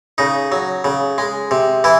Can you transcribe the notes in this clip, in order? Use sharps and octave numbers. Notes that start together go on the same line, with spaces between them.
C#3 D#4
F#3
C#3
G#3
C3
E3 E4